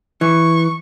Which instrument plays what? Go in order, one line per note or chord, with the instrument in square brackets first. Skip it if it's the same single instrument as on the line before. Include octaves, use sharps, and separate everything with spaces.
[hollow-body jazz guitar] E3 [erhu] C#6